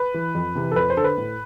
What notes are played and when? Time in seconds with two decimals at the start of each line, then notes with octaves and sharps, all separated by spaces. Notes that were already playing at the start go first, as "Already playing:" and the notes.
Already playing: B4
0.14 E3
0.35 F2
0.55 C3 E3
0.71 A4
0.76 F2 B4
0.90 C5
0.97 D3 A4
1.04 B4
1.18 A2